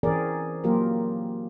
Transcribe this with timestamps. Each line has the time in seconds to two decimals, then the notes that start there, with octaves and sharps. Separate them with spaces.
0.03 E3 C4 C#4 G#4 A#4 D5
0.64 F#3 A#3 F4 G4 A#4